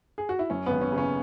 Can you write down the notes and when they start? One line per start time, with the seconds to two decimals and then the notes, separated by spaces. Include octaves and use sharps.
0.18 G#4
0.29 F#4
0.39 E4
0.50 F#2 C#4
0.66 G#1 B3
0.81 C#4
0.92 C#3
0.98 C#4